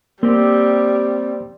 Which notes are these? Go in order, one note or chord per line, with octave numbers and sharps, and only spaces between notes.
G3 A#3 C4 G4